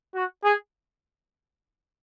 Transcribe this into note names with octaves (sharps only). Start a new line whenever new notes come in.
F#4
G#4